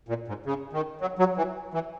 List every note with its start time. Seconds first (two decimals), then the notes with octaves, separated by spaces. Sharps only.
0.08 A#2
0.28 G#2
0.46 C#3
0.73 D#3
1.01 F#3
1.19 F#3
1.37 E3
1.74 E3